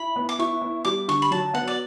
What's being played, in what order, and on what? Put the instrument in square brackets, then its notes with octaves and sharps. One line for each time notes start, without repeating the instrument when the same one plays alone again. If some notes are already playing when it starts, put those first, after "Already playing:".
Already playing: [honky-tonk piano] E4 [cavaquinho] B5
[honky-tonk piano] B3
[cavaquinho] D6
[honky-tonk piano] E4 [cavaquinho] C#6
[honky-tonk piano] B3
[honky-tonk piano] G3 [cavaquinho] D6
[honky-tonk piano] D3 [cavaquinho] C#6
[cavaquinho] B5
[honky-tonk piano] F#3 [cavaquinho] A5
[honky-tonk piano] B3 [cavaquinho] F#5
[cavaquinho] D5